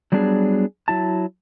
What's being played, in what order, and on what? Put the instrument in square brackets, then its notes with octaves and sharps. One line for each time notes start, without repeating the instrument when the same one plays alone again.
[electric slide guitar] F#3 G3 B3 D4 G4 G#4
F#3 E4 A5